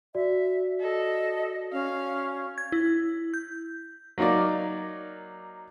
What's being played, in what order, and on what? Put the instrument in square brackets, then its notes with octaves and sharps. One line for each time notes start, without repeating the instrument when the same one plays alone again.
[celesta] F#4 D5 [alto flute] E5
[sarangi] A4 [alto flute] D#5
[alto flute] C#4 [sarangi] F5
[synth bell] G#6
E4
G6
[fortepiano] F#3 A#3 D#4 A#4 D5